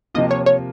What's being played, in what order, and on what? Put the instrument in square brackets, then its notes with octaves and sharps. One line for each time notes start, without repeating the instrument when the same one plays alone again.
[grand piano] C3 F3 A#3 F4 [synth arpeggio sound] D#5
[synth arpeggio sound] C#5
C#5